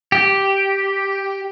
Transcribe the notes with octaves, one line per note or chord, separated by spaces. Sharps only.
G4